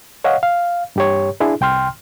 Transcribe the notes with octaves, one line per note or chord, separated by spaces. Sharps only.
C#5 D#5 F5 F#5
F5
G2 G4 C#5
D4 E4 G#4
C2 G5 C6 F6